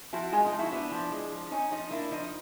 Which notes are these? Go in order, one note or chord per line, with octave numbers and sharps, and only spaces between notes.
F3 E4 F#4
G#3 D#4 F4
D#4 F4
F3
E4 F#4
B3 D4 E4
F3
G#3
F3
C#4 D#4
F3 D#4
A#3 D4 E4
F3 D#4